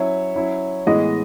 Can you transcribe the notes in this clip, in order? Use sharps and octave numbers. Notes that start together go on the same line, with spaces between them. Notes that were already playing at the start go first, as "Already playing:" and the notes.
Already playing: F#3 C#4 E4 C#5 E5
F#3 C#4 E4
A2 E3 G#3 B3 D#5